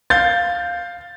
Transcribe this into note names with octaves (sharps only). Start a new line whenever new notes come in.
F5 G6 A6